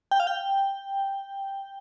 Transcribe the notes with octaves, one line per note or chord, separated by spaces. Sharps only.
G5
F5
G5